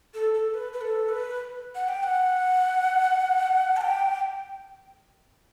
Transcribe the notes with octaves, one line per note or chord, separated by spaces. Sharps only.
A4
A4
B4
B4
A4
B4
F#5
G5
F#5
A5
G5